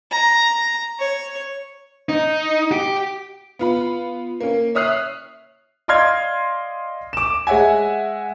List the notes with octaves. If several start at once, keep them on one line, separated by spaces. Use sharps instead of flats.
A#5
C#5
D#4
G4
B3 F4 B5
A#3 C#4
C#5 E5 D#6 F6 F#6 C7
D5 D#5 F5 C6 F6 G#6
D6 E7
G#3 C#5 E5 F#5 G#5